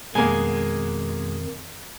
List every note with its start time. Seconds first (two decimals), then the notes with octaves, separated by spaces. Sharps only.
0.15 F2 B2 D#3 G#3 A#3 G#5